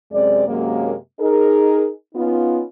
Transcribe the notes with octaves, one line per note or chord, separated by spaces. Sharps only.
F#2 C3 G#3 C4 D5
F#2 C3 F#3 G#3 A#3
D#4 G#4 A#4
B3 C#4 D#4 F4